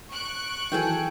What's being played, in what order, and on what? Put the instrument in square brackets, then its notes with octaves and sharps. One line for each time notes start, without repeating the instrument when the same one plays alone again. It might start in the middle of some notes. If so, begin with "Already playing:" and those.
[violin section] C#6 F#6 D7
[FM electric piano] D#3 E3 F#3 [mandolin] G#4 A4 G5